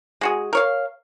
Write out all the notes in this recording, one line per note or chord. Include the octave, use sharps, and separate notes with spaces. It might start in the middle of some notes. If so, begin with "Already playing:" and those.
G#3 F#4 G#4
A#4 C#5 F5